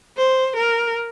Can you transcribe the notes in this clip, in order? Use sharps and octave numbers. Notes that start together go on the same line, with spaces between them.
C5
A#4